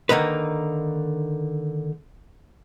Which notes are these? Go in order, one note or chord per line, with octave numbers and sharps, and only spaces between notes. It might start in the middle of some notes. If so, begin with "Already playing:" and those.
D3 D#3 A#3 D#4 B4